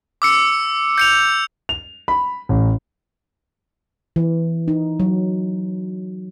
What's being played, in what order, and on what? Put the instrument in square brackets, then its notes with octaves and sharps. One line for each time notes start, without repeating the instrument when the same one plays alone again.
[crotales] D6 E6 C#7
G6 C#7 F7
[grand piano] F7
B5
A1
[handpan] E3
D#4
F#3